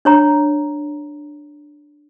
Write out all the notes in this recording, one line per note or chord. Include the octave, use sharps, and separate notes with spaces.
D4 C#5 A#5